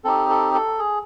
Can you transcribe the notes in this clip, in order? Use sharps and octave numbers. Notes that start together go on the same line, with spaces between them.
C4 D#4 G4 A4
A4
A4
G#4